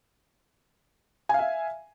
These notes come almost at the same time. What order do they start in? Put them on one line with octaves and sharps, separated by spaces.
G#5 F5 E5